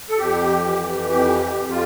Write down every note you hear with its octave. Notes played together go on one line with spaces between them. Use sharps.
A4
F2 G4
E3
F2 G4
G4
F2
F4